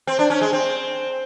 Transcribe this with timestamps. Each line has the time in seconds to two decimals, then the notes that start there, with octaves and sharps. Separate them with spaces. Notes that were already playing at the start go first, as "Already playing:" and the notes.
0.07 C4
0.19 D4
0.30 C#4
0.41 G#3
0.53 C4